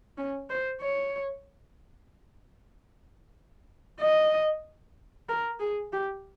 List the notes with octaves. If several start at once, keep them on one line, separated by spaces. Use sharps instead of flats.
C#4
C5
C#5
D#5
A#4
G#4
G4